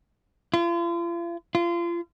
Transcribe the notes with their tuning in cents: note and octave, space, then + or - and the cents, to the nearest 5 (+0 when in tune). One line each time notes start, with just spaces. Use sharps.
F4 -40
F4 -30